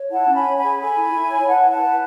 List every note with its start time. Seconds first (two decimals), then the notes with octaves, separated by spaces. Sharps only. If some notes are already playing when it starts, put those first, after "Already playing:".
Already playing: C#5
0.10 E4 F#5 A5
0.28 C#4
0.34 G#5 B5
0.46 C#5
0.57 G#5 B5
0.62 G#4
0.79 A4 G#5 B5
0.96 E4
1.13 E4
1.30 C#5
1.47 B4 F#5 A5
1.65 E4
1.70 F#5 A5
1.82 B4